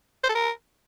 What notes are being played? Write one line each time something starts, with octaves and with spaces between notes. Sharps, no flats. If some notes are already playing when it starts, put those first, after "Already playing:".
C5
A4
A#4